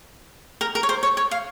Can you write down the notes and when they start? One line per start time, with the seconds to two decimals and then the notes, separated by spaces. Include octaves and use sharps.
0.61 A#4
0.75 A#4
0.83 C#5
0.89 C5
1.03 C#5
1.17 C#5
1.31 F5